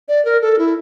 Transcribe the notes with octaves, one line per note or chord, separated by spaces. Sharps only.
D5
A#4
A4
E4